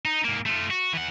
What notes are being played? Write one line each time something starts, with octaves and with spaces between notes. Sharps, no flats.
D#4
G#2 A#3
A3 F4
F#4
E3 F#5